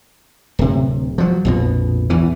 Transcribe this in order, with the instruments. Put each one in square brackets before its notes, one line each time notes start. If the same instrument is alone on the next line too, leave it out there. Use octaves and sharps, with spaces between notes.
[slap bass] D1 C3
F3 F#3
A#1 F2 B2
E2 E3